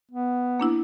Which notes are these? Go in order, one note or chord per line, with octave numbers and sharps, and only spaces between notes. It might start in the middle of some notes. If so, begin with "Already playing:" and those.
B3
A#3 D4 E4